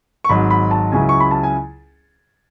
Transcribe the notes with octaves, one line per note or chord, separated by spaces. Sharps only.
C#6
G#1 G#2 F#3 B5
B5
A5
C#2 C#3 F#3 C#4 E4 G#5
C#6
B5
A5
G#5